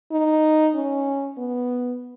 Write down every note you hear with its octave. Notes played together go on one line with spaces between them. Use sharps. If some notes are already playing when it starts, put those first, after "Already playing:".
D#4
C#4
B3